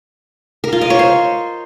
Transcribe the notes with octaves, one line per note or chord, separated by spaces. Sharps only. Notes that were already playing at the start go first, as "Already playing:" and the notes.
A#4
F4
D#5
C#5
C5